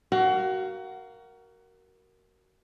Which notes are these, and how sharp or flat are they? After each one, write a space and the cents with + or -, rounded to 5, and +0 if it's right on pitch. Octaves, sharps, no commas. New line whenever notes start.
F#4 +25 A#4 +0 F5 +0